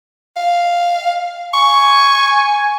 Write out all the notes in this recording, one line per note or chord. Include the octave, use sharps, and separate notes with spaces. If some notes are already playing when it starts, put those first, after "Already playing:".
F5
G#5 C#6